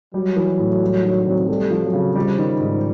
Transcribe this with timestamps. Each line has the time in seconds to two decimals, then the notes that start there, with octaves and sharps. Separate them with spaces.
0.14 F#3 G3
0.36 E3
0.59 A2
0.81 G3
1.04 D#3
1.26 C3
1.49 G3 A3
1.71 F3
1.83 F#3
1.93 C#3
2.15 F3 G3
2.38 D#3
2.60 G#2